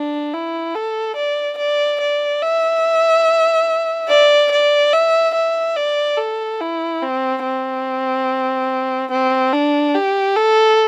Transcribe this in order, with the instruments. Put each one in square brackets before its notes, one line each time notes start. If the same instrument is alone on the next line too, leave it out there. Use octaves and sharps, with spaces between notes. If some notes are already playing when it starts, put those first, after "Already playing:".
Already playing: [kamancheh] D4
E4
A4
D5
D5
D5
E5
D5
D5
E5
E5
D5
A4
E4
C4
C4
C4
D4
G4
A4